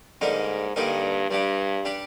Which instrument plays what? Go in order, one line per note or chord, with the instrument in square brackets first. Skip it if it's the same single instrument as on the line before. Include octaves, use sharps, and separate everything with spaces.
[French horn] G#2 [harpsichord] D3 G3 A#3 D#4 A#4
[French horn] G2 [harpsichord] D3 G3 A#3 D#4 A#4
[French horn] G2 [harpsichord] G3 D4 G4
[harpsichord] G3 D4 G4